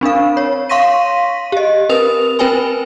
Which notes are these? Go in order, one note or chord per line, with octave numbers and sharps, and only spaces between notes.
C4 D4 A#4 F5
C#5
F5 C6 C#6 A#6 B6 D#7
G4 D#5
C4 A#4 B4 D#6 F7
C4 A#4 B4 G5 G#5 B5